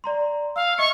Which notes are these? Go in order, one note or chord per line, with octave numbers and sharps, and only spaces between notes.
D5 A#5 C6
F5 E6
D#5 E5 C#6 C#7